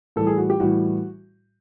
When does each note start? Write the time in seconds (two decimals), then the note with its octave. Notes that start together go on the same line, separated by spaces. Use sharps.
0.16 A2 E3 G3 A4
0.27 G#4
0.38 F#4
0.50 G4
0.60 A2 E3 G3 F#4